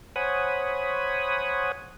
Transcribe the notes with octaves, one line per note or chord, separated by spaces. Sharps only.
C5 C#5 F#5 G#5 B5 D#6